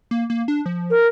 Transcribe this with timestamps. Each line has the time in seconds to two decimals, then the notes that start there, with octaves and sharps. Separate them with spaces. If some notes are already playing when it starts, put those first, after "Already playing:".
0.11 A#3
0.30 A#3
0.48 D4
0.66 F3
0.90 A#4